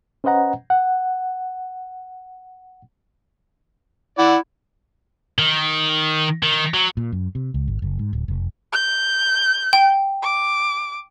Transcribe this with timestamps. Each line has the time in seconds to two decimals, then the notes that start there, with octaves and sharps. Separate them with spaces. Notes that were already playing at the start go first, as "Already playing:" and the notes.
0.24 C#4 B4 C5 D#5 F#5 A#5
0.70 F#5
4.18 E4 D5 F#5
5.39 D#3
6.43 D#3
6.74 F#3
6.97 A#2
7.12 F#2
7.35 C3
7.54 C#2
7.68 G#1
7.82 F#1
7.99 G#2
8.13 D1
8.28 F1
8.72 G6
9.73 G5
10.22 D6